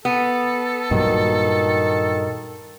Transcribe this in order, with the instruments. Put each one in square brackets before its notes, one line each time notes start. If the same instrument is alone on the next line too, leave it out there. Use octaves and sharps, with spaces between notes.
[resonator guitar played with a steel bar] B3 [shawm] A4
[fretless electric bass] G2 A#2 F#3 [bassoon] D#3